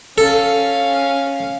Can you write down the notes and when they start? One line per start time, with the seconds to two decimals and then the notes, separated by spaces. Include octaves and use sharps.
0.18 C#4 A4 F5